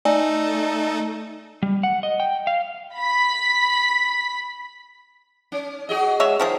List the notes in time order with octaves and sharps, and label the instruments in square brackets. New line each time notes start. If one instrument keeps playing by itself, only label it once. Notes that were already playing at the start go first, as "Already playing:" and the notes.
[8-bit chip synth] A3 D#4 A4 [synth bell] D5 G#5
[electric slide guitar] G3
F#5
D#5
G5
F5
[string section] B5 B6
[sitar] C#4
F#4 G#4 D#5
[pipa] G#3 C#5 E5
D#3 F3 G#4